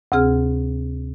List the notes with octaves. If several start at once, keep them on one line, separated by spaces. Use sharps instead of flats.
D2 C3 C4 G#4 F6